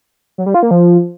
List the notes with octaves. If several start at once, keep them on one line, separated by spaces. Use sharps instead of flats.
F#3
G3
F4
A#3
F3